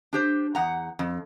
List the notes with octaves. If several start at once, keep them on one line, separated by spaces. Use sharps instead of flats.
D4 G4 C5
E2 F#5 A#5
F2